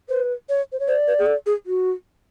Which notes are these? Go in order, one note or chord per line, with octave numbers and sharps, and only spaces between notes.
B4 C5
C#5
C5
C#5
C5 D5
B4
G#4
A4
G#4
F#4